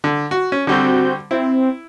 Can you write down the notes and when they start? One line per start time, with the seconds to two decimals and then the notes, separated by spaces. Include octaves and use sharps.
0.04 D3
0.31 F#4
0.52 C#4
0.67 D3 G3 C4 F#4 G6
1.31 C4 E4